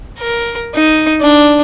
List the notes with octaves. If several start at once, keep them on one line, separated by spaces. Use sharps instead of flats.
A#4
D#4
D4